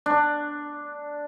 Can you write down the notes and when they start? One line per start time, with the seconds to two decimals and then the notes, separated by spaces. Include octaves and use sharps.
0.06 D4